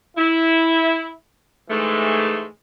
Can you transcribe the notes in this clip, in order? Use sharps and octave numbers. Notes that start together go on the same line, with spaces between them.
E4
G#2 E3 G#3 A3